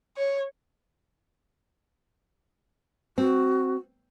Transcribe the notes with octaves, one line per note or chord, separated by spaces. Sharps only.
C#5
C4 F#4